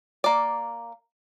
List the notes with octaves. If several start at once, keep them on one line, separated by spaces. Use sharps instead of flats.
A#3 D5